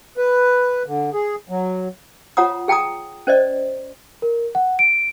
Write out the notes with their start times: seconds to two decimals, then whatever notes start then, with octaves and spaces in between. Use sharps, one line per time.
0.17 B4
0.86 D3
1.14 G#4
1.49 F#3
2.37 F4 C#5 F#5 A#5 D#6
2.68 G#4 G5 A5 A#5 D#6
3.27 C#4 C5 D5 D#5
4.22 A#4
4.55 F#5
4.79 D7